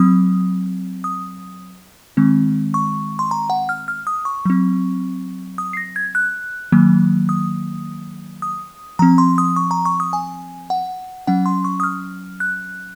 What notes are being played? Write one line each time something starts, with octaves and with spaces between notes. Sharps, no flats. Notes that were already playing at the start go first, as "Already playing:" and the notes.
Already playing: F#3 C4 D#6
D#6
D#3 G#3 C4
C#6
C6
A#5
F#5
F6
F6
D#6
C#6
F#3 C4
D#6
C7
A#6
G#6
F#6
D#3 F#3 A#3
D#6
D#6
F3 C4 A#5
C6
D#6
C#6
A#5
C#6
D#6
G#5
F#5
F#3 C#4 F#5
C6
C#6
D#6
F6
F#6